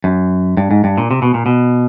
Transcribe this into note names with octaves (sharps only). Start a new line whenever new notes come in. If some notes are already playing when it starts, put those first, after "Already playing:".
F#2
G2
G#2
G2
A#2
C3
B2
A#2
B2